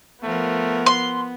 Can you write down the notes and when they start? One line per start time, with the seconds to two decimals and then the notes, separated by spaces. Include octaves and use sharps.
0.23 F3 A3 B3 A#4
0.86 C6